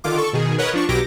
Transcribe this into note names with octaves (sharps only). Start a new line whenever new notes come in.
D3 D#3 F4 D6
A4 C#6
B2 D#3 G#4
A#4 B4 C#5 D#5 F#5
F3 D4 C#6
B1 B2 F#3 G4 D6 A#6